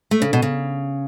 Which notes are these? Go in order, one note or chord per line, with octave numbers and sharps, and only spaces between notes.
A3
C#3
B2
C#3